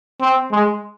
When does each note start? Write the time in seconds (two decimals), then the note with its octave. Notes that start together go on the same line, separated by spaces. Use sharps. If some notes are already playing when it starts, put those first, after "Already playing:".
0.21 C4
0.52 G#3